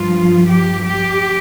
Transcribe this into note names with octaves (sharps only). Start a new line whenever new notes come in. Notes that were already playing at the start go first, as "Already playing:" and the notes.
Already playing: G2 F3 F4
G4
G4